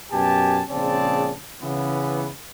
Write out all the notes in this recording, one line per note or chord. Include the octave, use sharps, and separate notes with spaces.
F#2 B2 G4 G#5 A5
A#1 C#3 C4 G#4 D5 A5
C#3 E3 B3